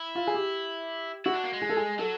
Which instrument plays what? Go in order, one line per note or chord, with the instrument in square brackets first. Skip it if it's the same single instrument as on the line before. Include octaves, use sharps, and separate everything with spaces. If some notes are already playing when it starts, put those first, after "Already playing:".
Already playing: [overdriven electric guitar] E4
[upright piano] F4
G#4
G4
[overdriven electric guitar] E4 [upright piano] F#4
[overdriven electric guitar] D4
A#3
G#3
[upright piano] G#4
A4
G#4
[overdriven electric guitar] F#3 [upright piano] A4